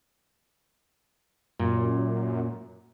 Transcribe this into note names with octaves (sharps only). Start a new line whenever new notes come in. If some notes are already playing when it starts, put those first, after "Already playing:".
F#2 A#2